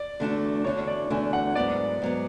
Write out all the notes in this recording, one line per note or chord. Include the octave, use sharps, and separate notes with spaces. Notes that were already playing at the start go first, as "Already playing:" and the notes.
Already playing: D5
E2 D3 A3 D4 F#4
E2 D3 A3 D4 F#4 C#5
D5
E2 D3 A3 D4 F#4 G#5
F#5
G#2 F#3 B3 D5
G#2 F#3 B3